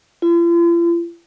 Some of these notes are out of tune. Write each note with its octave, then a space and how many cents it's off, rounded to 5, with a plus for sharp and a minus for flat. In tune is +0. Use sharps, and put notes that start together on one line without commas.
F4 -45